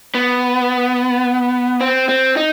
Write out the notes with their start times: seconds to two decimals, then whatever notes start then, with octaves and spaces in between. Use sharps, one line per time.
0.15 B3
1.81 C4
2.09 C4
2.37 D#4